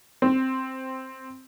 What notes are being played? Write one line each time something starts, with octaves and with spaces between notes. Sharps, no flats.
C4